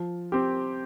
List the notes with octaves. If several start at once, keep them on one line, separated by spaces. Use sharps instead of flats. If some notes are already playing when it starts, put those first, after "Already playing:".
Already playing: F3
C4 G4